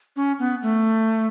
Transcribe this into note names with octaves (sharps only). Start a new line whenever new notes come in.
C#4
B3
A3